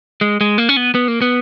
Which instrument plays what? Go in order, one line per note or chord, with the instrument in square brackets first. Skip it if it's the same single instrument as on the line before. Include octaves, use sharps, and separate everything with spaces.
[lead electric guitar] G#3
G#3
A#3
C#4
B3
B3
A#3
B3